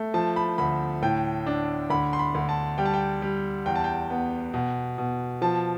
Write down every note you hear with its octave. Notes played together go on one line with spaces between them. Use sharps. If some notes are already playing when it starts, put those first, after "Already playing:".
Already playing: A3
F3 A5
B5
D2 B5
A2 G5
D4
D2 B5
C6
B5
D2
A5
G3 G5
A5
G5
G3
E2 G5
A5
G5
B3
B2
B2
F3 A5